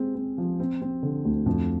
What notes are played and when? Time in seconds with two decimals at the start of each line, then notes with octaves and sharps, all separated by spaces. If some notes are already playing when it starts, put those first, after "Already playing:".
Already playing: G#3 C4
0.15 C4
0.38 F3
0.60 C4
0.81 C4
1.03 D3
1.25 D2
1.46 F2